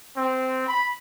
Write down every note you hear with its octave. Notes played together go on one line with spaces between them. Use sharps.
C4
B5